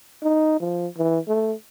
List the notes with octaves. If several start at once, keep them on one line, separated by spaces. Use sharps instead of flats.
D#4
F3
E3
A3